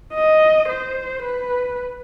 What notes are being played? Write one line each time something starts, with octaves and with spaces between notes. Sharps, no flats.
D#5
C5
B4